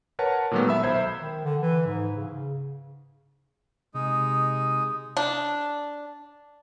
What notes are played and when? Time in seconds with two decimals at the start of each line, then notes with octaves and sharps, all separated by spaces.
0.19 A#4 B4 C#5 F#5 A5
0.51 A#2 D#3 F#3 G#3 A3 B3
0.68 E5 B5 E6
0.83 B1 C5 B5 G#6
1.20 D#3
1.45 D3
1.62 E3
1.87 G#2
2.17 C#3
3.94 C3 G#3 D#4
5.17 D4